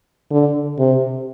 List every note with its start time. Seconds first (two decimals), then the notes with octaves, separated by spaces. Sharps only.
0.31 D3
0.79 C3